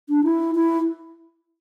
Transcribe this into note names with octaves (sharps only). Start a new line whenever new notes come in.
D4
E4
E4